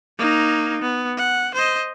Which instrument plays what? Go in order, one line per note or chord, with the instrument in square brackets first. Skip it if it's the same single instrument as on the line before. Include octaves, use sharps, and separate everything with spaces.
[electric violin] A#3 D#4
B3
F#5
C5 D#5